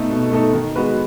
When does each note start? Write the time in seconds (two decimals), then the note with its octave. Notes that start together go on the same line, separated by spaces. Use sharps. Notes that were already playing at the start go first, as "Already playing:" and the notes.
Already playing: B2 A3 D#4 A4
0.10 B2
0.31 A3 D#4 A4
0.53 D#3
0.75 G#3 B3 F#4 B4